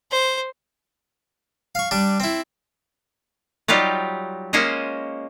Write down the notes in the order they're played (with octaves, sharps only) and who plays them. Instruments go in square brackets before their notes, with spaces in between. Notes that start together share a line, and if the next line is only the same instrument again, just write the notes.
[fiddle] C5
[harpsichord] F5 C#6
G3 D4
C4 E4
[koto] F#3 G3 D#4 F4 G4
G#3 A#3 C#4 C5 C#5 D#5